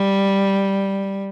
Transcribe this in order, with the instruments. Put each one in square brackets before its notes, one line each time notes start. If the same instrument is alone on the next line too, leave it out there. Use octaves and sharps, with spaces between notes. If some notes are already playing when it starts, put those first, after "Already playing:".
Already playing: [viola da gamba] G3